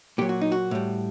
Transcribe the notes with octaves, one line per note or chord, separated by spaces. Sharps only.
A#2 F#3 G4
F#4
D#4
F#4
A2 G3